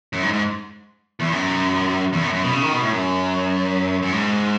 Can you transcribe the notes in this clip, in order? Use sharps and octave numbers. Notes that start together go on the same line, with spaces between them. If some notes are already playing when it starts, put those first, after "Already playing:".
F#2
G#2
G#2
E2
F#2
E2
F#2
F#2
B2
C#3
D#3
B2
A2
F#2
F#2
G#2